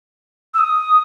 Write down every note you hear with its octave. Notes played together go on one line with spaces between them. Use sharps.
E6
D#6